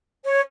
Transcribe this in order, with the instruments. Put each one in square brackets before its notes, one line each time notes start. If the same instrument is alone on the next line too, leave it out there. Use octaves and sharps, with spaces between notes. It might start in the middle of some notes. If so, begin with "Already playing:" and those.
[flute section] C#5